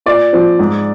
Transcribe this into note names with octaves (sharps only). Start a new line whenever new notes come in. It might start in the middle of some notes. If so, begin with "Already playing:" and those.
A#2 D5
F3 C4
G#2